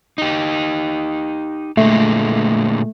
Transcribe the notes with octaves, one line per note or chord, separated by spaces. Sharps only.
D#4 G4
A#2 D3 G#3 A3